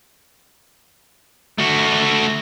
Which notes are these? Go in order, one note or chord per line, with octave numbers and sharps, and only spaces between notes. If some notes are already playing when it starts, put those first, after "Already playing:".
A3 F#4